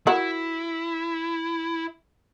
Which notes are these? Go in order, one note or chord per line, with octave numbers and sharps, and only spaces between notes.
E4 F#4 A#4